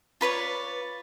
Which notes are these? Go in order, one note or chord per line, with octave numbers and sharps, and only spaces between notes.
F4 B4 C#5 D5